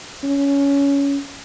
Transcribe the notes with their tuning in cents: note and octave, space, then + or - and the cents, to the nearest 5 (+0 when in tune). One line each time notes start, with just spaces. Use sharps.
C#4 +15